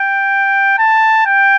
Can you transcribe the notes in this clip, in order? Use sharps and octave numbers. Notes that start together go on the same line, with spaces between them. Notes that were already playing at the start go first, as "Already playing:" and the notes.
Already playing: G5
A5
G5